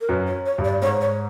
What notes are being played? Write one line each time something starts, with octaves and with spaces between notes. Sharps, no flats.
A#4
F#2 B4
C#5
C#5
G2
D5
G#2 C#5
C#5